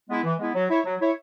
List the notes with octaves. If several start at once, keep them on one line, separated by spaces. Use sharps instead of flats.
G#3 B3 E4
E3
G#3 B3 E4
F#3
E4 C#5
F#3
E4 C#5